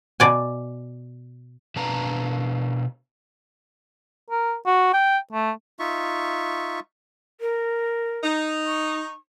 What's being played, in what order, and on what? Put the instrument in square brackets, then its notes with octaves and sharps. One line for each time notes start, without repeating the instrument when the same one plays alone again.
[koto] B2 D5 G#5
[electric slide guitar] B2 D4 B4 F5 A5 A#5
[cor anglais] A#4
F#4
G5
A3
[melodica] D#4 F4 E5 C#6
[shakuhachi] A#4
[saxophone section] D#4
[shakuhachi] C#6